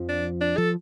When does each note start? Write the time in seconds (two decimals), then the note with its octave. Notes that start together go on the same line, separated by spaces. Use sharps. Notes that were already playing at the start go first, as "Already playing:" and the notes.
Already playing: F2 F3
0.08 D4
0.41 D4
0.57 F3 A4